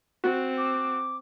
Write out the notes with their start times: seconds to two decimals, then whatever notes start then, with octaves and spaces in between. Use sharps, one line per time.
0.24 C4 F#4
0.58 D6